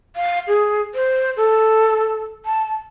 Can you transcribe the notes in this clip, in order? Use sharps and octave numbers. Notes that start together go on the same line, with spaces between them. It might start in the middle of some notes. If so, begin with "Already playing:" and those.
F5
G#4
C5
A4
A5